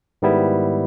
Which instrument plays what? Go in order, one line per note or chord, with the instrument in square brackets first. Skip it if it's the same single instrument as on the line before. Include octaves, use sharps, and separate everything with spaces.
[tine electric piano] G#2 D#3 G3 B3 E4